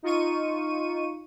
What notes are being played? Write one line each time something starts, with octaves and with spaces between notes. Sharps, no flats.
D#4 F4 C#6 D#7